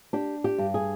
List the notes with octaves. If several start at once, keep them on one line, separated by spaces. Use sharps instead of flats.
D4 G4
G4
G2
G#4